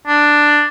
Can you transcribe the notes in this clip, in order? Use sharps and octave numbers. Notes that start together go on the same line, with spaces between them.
D4